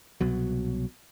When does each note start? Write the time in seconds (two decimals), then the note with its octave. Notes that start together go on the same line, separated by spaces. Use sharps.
0.21 C2 B2 F#3